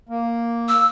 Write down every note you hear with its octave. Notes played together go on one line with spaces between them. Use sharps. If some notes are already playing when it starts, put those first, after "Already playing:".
A#3
E6